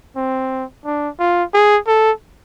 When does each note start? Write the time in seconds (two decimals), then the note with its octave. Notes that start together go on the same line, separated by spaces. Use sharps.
0.16 C4
0.85 D4
1.20 F4
1.54 G#4
1.87 A4